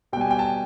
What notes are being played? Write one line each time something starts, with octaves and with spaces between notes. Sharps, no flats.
B2 G3 G5 G#5
G5
A5